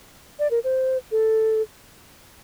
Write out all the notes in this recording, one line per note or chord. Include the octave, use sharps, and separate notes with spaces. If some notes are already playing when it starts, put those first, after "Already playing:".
D5
A#4
C5
A4